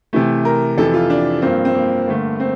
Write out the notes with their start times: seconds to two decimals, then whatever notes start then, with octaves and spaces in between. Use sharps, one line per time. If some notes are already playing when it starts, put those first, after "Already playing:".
0.13 C3 E3 A3
0.45 A#4
0.78 F2 C3 E3 A4
0.94 F4
1.10 D4
1.42 G2 F3 A#3 C4
1.65 C4
1.75 A#3
2.07 G2 D3 A3
2.40 C4